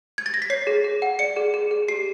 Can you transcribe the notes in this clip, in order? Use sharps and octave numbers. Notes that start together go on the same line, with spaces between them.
G#6
A6
A#6
B6
C#5 C7
G#4
G#4
F#5
D5 C#7
G#4
G#4
G#4
G4 C7